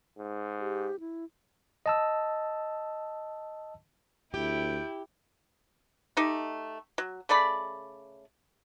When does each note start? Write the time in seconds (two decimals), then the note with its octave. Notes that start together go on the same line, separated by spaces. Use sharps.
0.19 G#2
0.60 G4
1.00 E4
1.86 D#5 A5 E6
4.34 D2 E4 G4 G5
6.17 A3 D#4 G4
6.98 F#3
7.29 C#3 A3 D5 B5